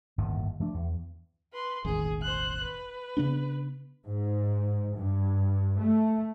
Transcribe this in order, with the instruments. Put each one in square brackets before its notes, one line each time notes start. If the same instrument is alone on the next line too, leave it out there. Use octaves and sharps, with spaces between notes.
[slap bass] G1 D#2 A2 D#3
F3 A3 D4
E2
[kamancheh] B4 C6
[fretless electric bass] E1 A1 D#3 [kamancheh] G#4
[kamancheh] C5 F#6
B4
[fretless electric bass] C#3 B3 D4
[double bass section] G#2
G2
A3